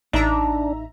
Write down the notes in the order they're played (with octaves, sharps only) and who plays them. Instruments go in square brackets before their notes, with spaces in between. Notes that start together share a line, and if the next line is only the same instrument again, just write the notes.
[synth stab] A1 E5 A#5 [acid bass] D4 [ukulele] D#4